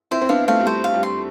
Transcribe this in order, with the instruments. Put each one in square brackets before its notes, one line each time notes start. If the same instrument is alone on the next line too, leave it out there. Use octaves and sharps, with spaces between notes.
[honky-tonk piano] C4 E4 [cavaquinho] C5
[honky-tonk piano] C4
[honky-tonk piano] B3 D4 [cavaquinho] F5
[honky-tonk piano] A3 C4 [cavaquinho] F5
[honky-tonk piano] G3
[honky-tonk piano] A3 [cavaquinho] C5
[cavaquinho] F5
[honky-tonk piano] G3
[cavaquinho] C6